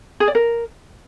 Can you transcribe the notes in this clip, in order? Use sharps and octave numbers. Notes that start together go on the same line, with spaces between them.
G#4
D5
A#4